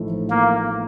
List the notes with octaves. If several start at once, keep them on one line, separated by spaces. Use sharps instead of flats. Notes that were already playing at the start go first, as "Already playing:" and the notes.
Already playing: A1 A2 F3 A3 D#4
A#3